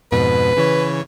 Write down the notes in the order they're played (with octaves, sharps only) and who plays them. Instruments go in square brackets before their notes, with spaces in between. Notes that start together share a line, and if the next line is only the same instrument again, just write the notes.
[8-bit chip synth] F2 G#2 B2 [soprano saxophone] B4
[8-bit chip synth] C#3 E3 C#5